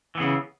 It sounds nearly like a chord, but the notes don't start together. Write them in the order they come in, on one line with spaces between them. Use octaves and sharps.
E3 B3 C#3